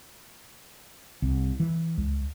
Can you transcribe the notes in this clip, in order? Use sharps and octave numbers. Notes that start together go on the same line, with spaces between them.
C2
E3
C#2